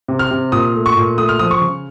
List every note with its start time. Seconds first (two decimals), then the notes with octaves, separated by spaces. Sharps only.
0.08 C3
0.19 F6
0.31 C3
0.52 A#2 D#6
0.75 A3
0.86 C#6
0.97 A#2
1.18 A3 D#6
1.29 F6
1.39 F3 D#6
1.51 C#6
1.61 C#3